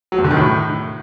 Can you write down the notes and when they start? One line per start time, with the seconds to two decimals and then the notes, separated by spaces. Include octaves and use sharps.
0.12 F#3
0.18 E2
0.24 D3
0.31 D#3
0.37 A2